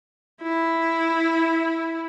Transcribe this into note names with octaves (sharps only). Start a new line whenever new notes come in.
E4